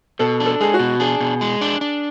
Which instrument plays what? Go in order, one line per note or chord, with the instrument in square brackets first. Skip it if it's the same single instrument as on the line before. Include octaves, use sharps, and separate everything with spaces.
[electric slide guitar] B2 [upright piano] A4
[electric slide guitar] D4
[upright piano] A4
[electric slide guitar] G#3 [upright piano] G#4
[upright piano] F#4
[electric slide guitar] B2
[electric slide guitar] D4 [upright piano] G#4
[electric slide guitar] B2
G#3
D4
D4